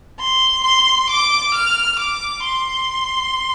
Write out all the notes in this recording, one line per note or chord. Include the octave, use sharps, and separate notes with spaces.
C6
C6
D6
F6
D6
C6